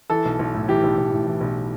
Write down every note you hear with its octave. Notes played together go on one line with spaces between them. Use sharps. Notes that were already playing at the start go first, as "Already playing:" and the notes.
E3 A4
B1
B1
A2
E3 G4
B1
B1
A2
E3
B1